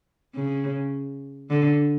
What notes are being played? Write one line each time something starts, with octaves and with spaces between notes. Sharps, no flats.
C#3
D3